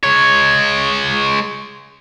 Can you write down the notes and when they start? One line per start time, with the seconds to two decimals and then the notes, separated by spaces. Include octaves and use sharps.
0.04 G#3 C#5